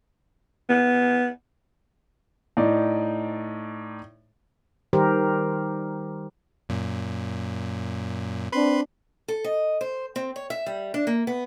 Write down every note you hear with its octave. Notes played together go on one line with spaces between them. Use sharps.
B3
A2 D#4 D5
D#3 G3 G4 A#4 C5
F#2 A#2
C4 D4 B4 B5 C6
A4
D#5
C5
C4
C#5
E5
G3
D4
A#3
B3